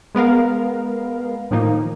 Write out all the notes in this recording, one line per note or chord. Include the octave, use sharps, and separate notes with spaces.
G#3 B3 A#4 F5
A2 D#3 F3 A#3 D#4